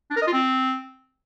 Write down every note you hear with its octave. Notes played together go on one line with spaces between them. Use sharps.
D4
A#4
D#5
F4
C4